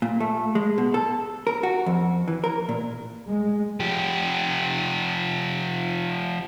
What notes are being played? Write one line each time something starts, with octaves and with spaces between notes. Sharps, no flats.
A#2
A3
G#3
B2
A4
A#4
F#4
F2
E3
A#4
A#2
G#3
F3 G4